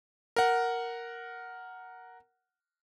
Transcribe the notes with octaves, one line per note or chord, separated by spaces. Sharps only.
A#4 F#5